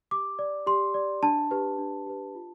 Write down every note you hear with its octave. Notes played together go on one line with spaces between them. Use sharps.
G4 D6
D5
G4 C6
D5
D4 A5
G4 B4
D4
G4 B4
F4